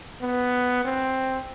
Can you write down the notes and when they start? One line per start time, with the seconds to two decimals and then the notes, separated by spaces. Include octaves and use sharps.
0.21 B3
0.84 C4